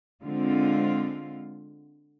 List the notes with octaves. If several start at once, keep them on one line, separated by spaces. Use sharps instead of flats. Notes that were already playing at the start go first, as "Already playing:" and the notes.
D3 G#3 C4 F4